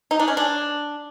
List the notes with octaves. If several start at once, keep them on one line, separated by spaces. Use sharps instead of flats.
D#4
D4
C#4
D4